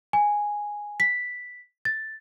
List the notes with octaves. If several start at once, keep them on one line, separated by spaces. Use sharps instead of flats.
G#5
B6
A6